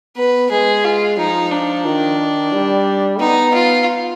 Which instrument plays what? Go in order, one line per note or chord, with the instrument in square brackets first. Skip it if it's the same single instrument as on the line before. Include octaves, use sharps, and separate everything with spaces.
[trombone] B3 [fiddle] B4
[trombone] G#3 [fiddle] G#4
[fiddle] F4
[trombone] F3 [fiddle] D#4
[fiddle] D4
[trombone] D#3
D#3
G3
[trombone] B3 [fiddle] D#4
[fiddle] F4